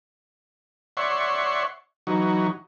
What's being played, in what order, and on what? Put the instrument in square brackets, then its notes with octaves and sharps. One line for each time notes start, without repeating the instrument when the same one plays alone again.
[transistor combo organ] C#5 D5 E5 F#5 C6 C#6
E3 F#3 D#4 F#4